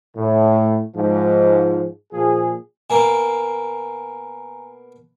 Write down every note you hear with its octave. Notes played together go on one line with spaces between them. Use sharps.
A2
G#2 F3
A#2 F3 G#4
B2 A#3 G#5 A#5